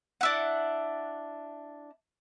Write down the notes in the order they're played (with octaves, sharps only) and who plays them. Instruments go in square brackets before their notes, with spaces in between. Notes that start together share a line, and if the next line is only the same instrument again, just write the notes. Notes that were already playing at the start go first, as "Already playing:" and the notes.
[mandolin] D4 E4 F#5